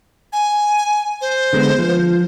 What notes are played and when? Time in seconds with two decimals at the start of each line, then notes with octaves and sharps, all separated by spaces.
0.33 G#5
1.21 C5
1.53 D3 G#3 B3
1.78 F3